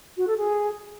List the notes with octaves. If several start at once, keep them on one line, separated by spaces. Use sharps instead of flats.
F#4
A4
G#4